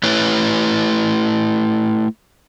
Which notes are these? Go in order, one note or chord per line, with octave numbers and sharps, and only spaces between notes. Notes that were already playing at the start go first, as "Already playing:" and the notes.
A3 E4 B4 C#5